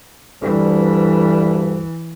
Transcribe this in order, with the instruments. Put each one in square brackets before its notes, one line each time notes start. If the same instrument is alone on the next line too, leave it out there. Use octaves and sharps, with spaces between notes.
[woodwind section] D2 G2 G3 [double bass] E3